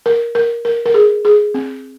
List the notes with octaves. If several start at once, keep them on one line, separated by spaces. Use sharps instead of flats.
A#4
A#4
A#4
A#4
G#4
G#4
C4